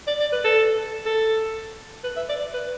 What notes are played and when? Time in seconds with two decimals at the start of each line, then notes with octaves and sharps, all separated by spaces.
0.07 D5
0.20 D5
0.32 B4
0.45 A4
1.06 A4
2.04 B4
2.17 E5
2.29 D5
2.54 B4